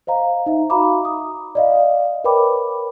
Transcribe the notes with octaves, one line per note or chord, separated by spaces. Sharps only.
C5 D#5 F5 A#5
D#4 D#5 E5
F#4 F5 A#5 B5 D6
D#6
D5 D#5 F5
A#4 B4 C#5 G5 B5 D6